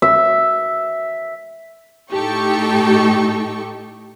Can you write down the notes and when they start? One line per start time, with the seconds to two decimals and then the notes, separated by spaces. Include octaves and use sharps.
0.02 E5
2.12 A2 D#4 G4 A4 G5 C#6